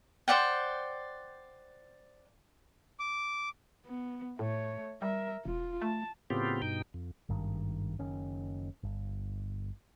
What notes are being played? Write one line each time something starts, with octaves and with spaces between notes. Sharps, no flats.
C5 D5 F#5 G5
D6
B3
A2 A3 C#5
G3 A#4 E5
E1 F4
A3 A5
A2 C#3 B3 C4 F4 G4
G2 B2 D#4 G5
F2
G#1 G2 D#3
F#1 D#3 C#4
G1